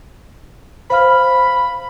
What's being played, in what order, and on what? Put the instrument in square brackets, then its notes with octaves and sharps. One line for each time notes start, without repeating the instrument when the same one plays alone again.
[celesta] C5 F5 F6 [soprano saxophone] B5